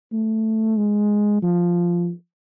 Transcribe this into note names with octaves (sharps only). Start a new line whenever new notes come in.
A3
G#3
F3